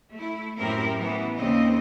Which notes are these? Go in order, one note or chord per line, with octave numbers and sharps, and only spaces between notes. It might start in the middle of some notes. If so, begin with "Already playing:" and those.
A3 E4
F#2 A2 C4 E4 G4 A#4
E3 B3
D#2 C#3 C4 D#5